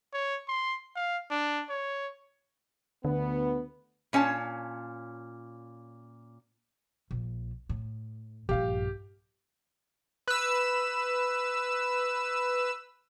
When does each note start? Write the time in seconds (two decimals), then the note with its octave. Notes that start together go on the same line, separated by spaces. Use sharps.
0.13 C#5
0.48 C6
0.96 F5
1.31 D4
1.69 C#5
3.05 D2 D3 B3
4.13 A#2 C#4 C#5 A5
7.11 A#1
7.69 A2
8.49 A#1 G2 G4 F5
10.27 B4 E6